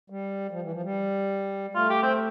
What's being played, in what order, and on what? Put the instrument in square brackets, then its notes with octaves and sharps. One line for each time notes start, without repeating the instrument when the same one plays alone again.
[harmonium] G3
F3
E3
F3
G3
[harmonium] A3 [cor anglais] F4
[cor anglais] G4
C4